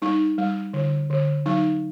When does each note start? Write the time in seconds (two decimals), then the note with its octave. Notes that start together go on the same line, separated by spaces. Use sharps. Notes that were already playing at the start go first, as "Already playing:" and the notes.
0.02 G3 D#4
0.38 G3
0.73 D3
1.10 D3
1.46 F#3 D#4